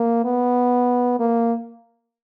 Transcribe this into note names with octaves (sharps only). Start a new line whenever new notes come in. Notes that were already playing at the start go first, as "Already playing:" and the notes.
Already playing: A#3
B3
A#3